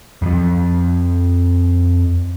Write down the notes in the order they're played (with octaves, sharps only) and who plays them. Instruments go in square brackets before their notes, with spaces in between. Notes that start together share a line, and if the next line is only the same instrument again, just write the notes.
[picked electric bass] F2 F3